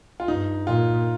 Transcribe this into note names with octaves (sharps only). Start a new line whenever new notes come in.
F4
G2 D#4
A#2 F4